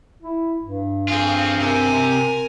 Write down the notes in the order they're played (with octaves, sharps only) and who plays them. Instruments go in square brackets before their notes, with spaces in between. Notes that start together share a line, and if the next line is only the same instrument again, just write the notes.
[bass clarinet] E4
G2
[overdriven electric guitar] C4 F4 [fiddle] G#4
[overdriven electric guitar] C3 C4 [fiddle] A#4 G#5